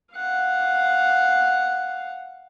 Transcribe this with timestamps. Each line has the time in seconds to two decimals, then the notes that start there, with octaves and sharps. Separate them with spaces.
0.15 F5 F#5